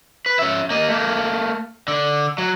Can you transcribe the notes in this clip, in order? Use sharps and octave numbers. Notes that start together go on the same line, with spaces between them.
B4
C#4 E5
A#3 D#5
A3 A#3
D3
F#3